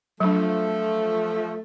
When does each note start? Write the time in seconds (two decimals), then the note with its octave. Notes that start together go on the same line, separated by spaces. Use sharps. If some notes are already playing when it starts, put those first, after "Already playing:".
0.20 F3 F#3 A3 D4